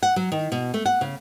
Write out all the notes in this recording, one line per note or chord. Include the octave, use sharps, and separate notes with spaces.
F#5
F#3
D#3
B2
A3
F#5
C#3